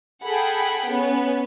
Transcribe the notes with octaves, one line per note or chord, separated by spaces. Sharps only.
G#4 A4 F#5 G5 B5
B3 C#4